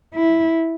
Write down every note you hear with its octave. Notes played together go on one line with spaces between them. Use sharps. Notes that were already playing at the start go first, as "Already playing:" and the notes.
E4